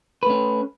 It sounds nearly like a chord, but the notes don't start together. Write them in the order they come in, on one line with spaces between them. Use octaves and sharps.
B4 A3 C#4